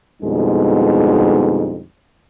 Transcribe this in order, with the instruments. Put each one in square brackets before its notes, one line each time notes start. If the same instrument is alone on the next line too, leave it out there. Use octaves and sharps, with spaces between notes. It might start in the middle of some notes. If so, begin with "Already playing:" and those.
[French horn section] F2 B2 D3 G3 G#3 D#4